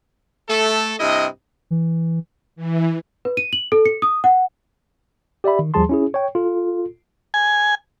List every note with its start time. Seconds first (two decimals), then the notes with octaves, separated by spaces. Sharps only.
0.49 A3 A4
1.00 G2 C3 E4 D#5
1.71 E3
2.56 E3
3.25 B4
3.37 D#7
3.53 F#7
3.72 A4
3.85 C#7
4.02 D#6
4.24 F#5
5.44 G4 D5 E5 B5
5.59 D#3
5.74 D#2 F3 G3 G#4 A5 C6
5.89 C#4 E4 G#4
6.14 C#5 G5
6.35 F4 A4
7.34 G#5